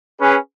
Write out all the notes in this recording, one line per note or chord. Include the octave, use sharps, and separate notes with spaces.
C#4 G#4 B4